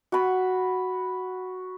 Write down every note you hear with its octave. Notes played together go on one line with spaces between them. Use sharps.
F#4 B5